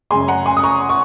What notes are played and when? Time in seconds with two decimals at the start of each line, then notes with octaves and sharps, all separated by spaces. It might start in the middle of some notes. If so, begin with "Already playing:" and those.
0.11 F#2 C#3 G#3 G#5 C6
0.28 F#5 A#5
0.46 G#5 C6
0.57 D#6
0.63 A#5 C#6
0.89 C#6